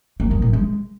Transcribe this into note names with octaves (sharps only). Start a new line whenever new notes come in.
A#3
D#3
A2
G#3